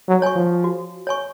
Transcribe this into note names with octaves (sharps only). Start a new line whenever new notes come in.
F#3
C#5 G#5 C#6
F3
F#4
C#5 G#5 C#6